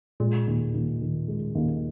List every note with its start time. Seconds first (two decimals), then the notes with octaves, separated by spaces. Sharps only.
0.20 A#2 G#3
0.47 D#2
0.74 D#2
1.01 D#3
1.28 G#3
1.55 D#2